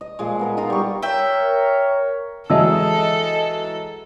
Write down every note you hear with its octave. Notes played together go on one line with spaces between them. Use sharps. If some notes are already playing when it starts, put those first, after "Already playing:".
D#5
A#2 F3 G#3
B3 A#4 B5
D#4 F4 A#5
G3 C#6
A#4 C#5 E5 G5
E3 F#3 G#3 A4 D#5 E5 A5 E6